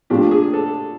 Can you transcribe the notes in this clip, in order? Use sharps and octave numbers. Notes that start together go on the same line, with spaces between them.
A#2 F3 A3 D4 G4
G#4
A4